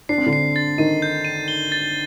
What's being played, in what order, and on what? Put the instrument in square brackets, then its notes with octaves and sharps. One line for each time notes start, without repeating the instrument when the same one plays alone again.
[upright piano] D4 [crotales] C7
[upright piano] C4
D3 D4
[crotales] C7
A6
[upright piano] D#3 D#4 [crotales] D#7
[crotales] G6
D#7
G7
A6